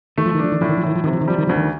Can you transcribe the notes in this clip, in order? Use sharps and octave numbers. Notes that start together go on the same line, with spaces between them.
D#3 A3
F3
D#3
F3 D4
D#3
A2 F3
D#3
F3
A2 D#3
F3
C3 D#3
F3
D#3
F3 G3
D#3
D2 F3
D#3